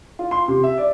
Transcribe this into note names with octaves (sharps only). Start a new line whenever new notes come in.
F4
C6
C3
E5
D5